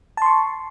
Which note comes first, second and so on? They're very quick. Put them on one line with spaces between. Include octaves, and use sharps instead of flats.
A5 C6 C#6